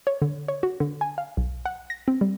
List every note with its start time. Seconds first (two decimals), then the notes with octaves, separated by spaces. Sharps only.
0.07 C#5
0.22 D3
0.48 C#5
0.63 F#4
0.80 D3
1.01 G#5
1.18 F5
1.37 B1
1.66 F#5
1.90 A#6
2.08 C4
2.21 G3